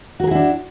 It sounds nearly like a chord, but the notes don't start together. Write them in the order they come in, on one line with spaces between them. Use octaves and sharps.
F#4 A#4 G#4 E4 D4